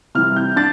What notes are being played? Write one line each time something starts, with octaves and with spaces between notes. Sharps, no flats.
C3 E3 G3 F6
G6
D4 A6